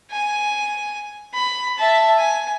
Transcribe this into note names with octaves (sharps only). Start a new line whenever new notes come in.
G#5
B5
E5 A5
G#5